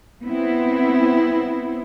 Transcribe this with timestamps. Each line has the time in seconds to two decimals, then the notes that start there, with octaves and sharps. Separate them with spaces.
0.23 B3 C4 E4